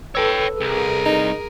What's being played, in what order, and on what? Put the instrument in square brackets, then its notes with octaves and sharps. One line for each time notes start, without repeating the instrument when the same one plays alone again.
[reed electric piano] A4 B4 E6 [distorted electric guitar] C#5 G5
[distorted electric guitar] C2 [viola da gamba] G#4 A#4
[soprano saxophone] D#4